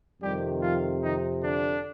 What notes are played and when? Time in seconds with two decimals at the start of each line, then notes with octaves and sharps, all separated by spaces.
0.21 F2 C3 D#3 G3 G4
0.62 F3 F4
1.03 D#3 D#4
1.42 D3 D4